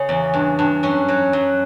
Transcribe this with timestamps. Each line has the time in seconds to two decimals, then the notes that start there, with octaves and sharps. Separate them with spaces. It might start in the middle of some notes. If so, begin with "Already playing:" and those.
Already playing: C#3 C#4
0.09 E2
0.34 G2
0.59 G2
0.83 F#2 C#4
1.08 F#3
1.33 F#2